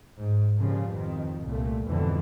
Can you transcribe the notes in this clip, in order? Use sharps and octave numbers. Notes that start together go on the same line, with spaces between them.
G#2
A#2 C#3 F3 G3
F2 B2 D#3
C2 A#2 A3
F2 G#2 B2 D3 E3